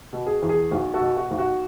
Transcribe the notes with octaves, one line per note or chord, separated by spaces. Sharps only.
B2
G#4
E2
G#4
B1 F#4
F#4 A4
B2
F#4
B1
F#4